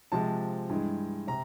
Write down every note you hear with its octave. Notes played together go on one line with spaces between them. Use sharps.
C3 F3 G#3 A5
G2 E3 G#3
C3 A#5